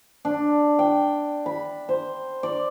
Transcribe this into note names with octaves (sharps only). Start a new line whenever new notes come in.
D4
G5
B5
C5
D5